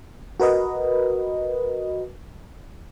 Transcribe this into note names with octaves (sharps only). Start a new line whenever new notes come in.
F#4 A#4 B4 D#5